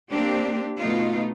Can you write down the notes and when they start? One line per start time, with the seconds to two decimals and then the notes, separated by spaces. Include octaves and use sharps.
0.10 A#3 C4 D4 G4
0.78 B2 A3 D#4 F4